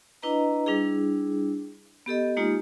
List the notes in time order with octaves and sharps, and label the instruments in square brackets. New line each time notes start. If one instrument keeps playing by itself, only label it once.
[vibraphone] D4 E4 B4 D#5 A#5
G3 D4 E4 G#4
B3 G4 A4 D#5
G#3 A#3 D#4 F4 G4